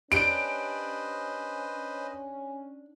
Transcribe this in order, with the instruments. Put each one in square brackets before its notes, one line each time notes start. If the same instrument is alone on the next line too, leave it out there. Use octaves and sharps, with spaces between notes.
[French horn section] C#4 [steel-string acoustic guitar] D4 G4 [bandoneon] B4 C5 D#5 [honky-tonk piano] D7